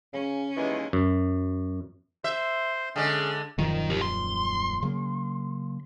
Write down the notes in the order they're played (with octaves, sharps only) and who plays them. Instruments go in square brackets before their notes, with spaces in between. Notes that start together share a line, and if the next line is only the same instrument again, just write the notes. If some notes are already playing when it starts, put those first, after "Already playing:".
[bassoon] C#3 [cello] C#4
[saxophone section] D#2 G#3 [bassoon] E3
[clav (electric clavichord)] F#2
[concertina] C5 C6 [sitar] E5
[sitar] D3 G#3 [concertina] C#4 G#4
[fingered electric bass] D#1 F#2 F3 [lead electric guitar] D#3
[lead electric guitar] G4 A#4
C6
[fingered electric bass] C#3 F#3 A#3